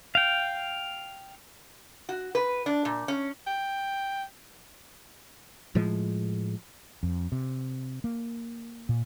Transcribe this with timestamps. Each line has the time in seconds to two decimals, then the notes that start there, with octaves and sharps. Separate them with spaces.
0.15 F5 G5
2.09 F#4
2.35 B4
2.66 D4
2.85 A#2
3.08 C#4
3.47 G5
5.75 A2 F3 G#3
7.03 F2
7.32 C3
8.04 A#3
8.89 A#2